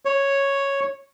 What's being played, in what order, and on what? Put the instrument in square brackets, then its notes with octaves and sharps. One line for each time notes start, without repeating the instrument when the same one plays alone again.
[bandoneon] C#5